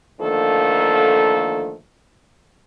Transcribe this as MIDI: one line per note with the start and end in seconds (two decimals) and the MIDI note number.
0.21 1.76 50
0.21 1.76 51
0.21 1.76 53
0.21 1.76 57
0.21 1.76 58
0.21 1.76 69